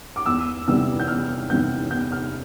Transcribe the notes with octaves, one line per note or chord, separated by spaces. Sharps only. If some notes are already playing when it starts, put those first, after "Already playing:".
D6
E2 E6
C3 E3 G3 B3 E6
G6
E2 F6
C3 E3 G3 B3 G6
E2 G6
F6